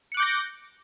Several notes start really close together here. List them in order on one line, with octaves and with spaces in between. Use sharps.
C#7 F#6 D6 G6 A#6